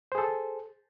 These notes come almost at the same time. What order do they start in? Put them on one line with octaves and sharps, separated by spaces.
C5 G#4 A4